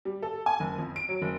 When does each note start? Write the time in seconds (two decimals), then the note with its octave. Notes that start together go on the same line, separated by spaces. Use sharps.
0.05 G3
0.22 A4
0.46 G#5
0.60 F#1
0.78 F2
0.96 D7
1.09 F#3
1.22 F#1